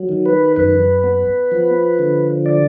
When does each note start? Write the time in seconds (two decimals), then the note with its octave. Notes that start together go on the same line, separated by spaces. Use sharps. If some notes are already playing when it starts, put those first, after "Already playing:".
Already playing: F#3
0.09 D#3
0.26 B4
0.56 F#2 B4
1.04 B3
1.52 F3
1.99 D3
2.46 D5